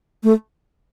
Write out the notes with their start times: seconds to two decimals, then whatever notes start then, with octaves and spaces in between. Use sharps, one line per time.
0.24 A3